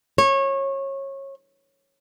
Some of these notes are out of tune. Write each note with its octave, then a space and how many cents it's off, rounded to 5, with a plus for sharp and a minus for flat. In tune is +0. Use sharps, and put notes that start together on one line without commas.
C#5 -25